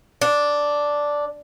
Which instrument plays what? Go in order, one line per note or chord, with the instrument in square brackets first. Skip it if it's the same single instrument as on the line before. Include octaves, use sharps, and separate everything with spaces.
[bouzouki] D4